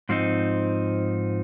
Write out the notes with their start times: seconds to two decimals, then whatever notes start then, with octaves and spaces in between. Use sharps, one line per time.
0.09 G#2 F3 C4 D#4